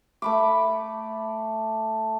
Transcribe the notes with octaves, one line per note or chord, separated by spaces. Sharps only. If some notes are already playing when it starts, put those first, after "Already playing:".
A3 B5 D6